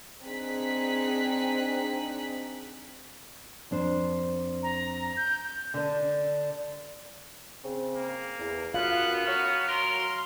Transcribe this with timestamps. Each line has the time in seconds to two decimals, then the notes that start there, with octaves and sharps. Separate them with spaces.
0.23 C4 D4 D#4 G#4 F#6 B6
3.71 F2 D4 C5
4.63 A#5
5.17 G6
5.74 D3 D4
7.64 C#3 C4
7.95 A#3
8.39 E2
8.74 F#2 B3 F4 F5 F#6
9.26 F#3 F#4 F6
9.68 A#4 C6